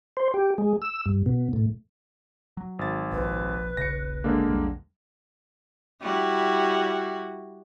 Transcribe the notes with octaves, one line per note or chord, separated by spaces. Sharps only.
C5
G4
G#3
E6
G2
B2
A2
F#3
G#1 A6
F1 A#1 F2 B4
D#1 A#1 C#3 A#6 C#7
D3 G#3 A#3
A#1 E2 G3
G3 E4 F#4